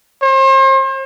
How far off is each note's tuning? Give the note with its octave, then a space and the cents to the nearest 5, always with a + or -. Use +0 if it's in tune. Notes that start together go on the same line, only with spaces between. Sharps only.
C5 +40